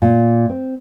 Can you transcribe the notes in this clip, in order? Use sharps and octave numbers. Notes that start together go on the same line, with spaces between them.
A#2
C4